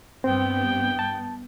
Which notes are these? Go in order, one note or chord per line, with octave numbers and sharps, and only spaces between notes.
G2 B3 C4 G5
A5